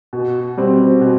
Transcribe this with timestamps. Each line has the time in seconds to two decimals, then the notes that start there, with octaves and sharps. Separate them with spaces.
0.13 B2
0.57 G3 C4
1.01 B2